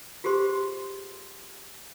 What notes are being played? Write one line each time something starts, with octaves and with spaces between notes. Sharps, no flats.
F4 G4 G#4 C5 C6